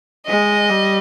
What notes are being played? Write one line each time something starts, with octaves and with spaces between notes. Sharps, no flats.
G#3 D#5
G3